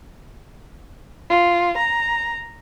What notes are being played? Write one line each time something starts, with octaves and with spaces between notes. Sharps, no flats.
F4
A#5